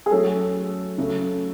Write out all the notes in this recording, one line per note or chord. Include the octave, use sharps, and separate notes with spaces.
G#4
F#3 A3 C#4 A4
C#3 F#3 A3